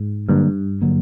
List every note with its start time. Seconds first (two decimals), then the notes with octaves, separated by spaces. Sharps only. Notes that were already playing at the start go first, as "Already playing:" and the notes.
Already playing: G#2
0.29 G2 D3 F#3 A#3
0.82 D3 F#3 A#3